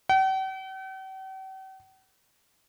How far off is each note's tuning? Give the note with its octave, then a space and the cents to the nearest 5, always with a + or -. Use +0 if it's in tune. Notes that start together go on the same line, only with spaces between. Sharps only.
G5 -45